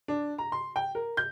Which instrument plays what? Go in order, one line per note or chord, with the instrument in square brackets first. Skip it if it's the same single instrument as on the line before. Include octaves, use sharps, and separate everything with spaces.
[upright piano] D4
A#5
C6
G5
A#4
G6